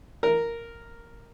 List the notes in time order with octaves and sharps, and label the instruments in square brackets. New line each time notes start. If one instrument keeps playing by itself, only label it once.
[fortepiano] A#4